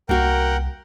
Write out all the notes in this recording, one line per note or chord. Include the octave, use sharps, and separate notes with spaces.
C2 A#3 F#4 A#4 F#5 G5